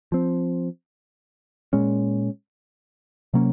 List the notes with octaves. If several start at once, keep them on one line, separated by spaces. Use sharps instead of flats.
F3 C4
A#2 G#3 C#4
C3 F#3 A#3 C#4